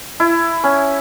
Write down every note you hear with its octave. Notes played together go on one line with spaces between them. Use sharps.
E4
C#4